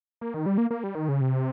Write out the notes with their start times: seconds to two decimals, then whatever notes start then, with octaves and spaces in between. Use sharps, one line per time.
0.21 A#3
0.34 D#3
0.46 G3
0.58 A#3
0.71 A#3
0.84 G3
0.95 D#3
1.09 C#3
1.21 C3